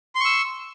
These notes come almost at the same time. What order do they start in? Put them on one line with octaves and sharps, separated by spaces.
C6 C#6 E6